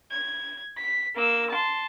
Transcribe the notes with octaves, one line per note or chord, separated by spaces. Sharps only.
G#6
B6
A#3 E6
A5 C6